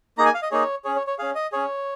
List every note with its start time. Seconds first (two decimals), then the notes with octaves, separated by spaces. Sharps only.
0.18 A#3 D#4 G#4 A#5
0.25 G#5
0.34 F5
0.42 D#5
0.51 A#3 D#4 G#4 C#5
0.85 C#4 G#4 C#5
0.96 C#5
1.07 C#5
1.19 C#4 G#4 F5
1.35 D#5
1.52 C#4 G#4 C#5